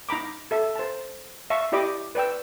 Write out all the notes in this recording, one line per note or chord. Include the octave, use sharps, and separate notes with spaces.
D#4 A#5 B5 D6
A4 E5
C5 A5
E5 F5 A5 C#6
E4 G4 D5 D#5 B5 D6
B4 D5 G5 E6